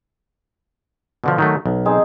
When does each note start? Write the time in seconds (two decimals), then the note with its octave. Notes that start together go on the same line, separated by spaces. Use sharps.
1.24 B2 D3 F3
1.38 D#3 F#3 A3
1.66 B1
1.85 C4 D#4 G#4